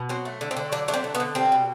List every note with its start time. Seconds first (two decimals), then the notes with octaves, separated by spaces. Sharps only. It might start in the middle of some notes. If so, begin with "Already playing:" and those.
Already playing: B2
0.09 F#3 C4
0.25 A3
0.41 D3
0.51 C4
0.57 D3
0.72 F#3 D4
0.88 A3 D4
0.94 C4
1.04 D3
1.15 B3
1.20 D3
1.35 G3 C4
1.52 B2